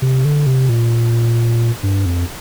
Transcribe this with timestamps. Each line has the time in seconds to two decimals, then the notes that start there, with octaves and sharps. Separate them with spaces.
0.02 C3
0.25 D3
0.46 C3
0.69 A#2
1.83 G2
2.06 F2